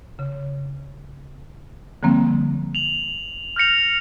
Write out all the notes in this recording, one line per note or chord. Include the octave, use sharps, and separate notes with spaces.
C#3
D3 F3 G3 A#3 C4
F7 F#7
F6 G6 A#6 C#7 F7